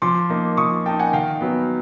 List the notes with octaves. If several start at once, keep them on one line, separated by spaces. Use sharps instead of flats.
F3 C6 D6
A#3 D#4
F3 C#6 D#6
A#3 D#4 G5 A5
F#5 G#5
D#3 F5 G5
F#3 B3